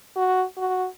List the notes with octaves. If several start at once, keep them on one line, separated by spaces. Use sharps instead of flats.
F#4
F#4